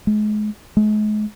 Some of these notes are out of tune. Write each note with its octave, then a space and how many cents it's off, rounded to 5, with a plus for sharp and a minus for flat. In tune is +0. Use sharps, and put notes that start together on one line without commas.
G#3 +35
G#3 +40